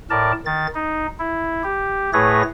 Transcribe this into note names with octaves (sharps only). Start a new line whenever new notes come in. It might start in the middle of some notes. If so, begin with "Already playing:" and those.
A2 A#4 D5 A5
D#3 A6
D#4
E4
G4
A2 A3 G#4 B4 C#5 A#6